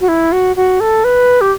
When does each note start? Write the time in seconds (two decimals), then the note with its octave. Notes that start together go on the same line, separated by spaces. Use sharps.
0.01 F#4
0.08 E4
0.32 F#4
0.56 F#4
0.80 A4
1.04 B4
1.41 G4